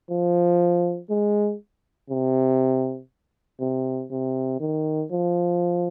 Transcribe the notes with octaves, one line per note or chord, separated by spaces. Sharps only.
F3
G#3
C3
C3
C3
D#3
F3